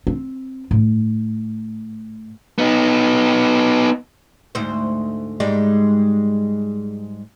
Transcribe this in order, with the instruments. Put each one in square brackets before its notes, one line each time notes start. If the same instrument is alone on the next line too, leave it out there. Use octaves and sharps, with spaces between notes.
[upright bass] C4
A2
[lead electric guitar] B3 D#4
[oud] D2 G#2 C5
G#2 G3 G#3